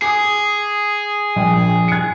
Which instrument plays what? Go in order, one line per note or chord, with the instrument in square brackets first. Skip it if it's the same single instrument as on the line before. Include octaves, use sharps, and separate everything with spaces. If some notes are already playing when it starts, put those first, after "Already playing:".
[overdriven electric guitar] G#4 [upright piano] D6 D#6
[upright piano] A#1 G5 G#5
G#6 C#7